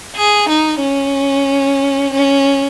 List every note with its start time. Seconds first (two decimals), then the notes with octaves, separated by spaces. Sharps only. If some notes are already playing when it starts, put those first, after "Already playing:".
0.16 G#4
0.49 D#4
0.81 C#4
2.13 C#4